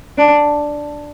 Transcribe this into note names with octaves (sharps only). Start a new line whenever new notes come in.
D4